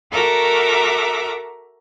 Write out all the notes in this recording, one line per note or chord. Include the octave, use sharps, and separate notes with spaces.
F#4 A4 A#4 E5 A#5 D6